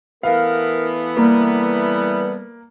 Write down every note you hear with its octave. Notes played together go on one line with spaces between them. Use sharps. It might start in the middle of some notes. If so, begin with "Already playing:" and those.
E3 A3 B3 A#4 F5
G3 A#3